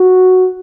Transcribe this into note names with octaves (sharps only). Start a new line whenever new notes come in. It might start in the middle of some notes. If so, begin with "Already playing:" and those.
Already playing: F#4